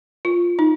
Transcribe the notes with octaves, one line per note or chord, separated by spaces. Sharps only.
F4
D#4